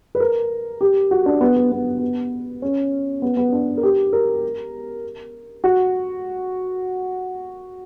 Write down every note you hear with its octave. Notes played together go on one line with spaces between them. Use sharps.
B4
A#4
G4
F#4
D4
B3
B3
B3
B3
C#4
B3
B3
D4
A#4
G4
A#4
F#4